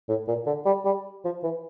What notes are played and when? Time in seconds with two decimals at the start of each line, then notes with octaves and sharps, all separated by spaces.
0.09 A2
0.28 A#2
0.46 D3
0.66 G3
0.85 G3
1.25 F3
1.44 E3